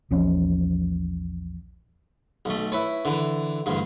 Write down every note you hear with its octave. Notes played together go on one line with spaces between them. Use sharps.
A#1 E2 F3 C#4
B1 A3
E4 B4 C#5
D3 E3
A1 D2 G2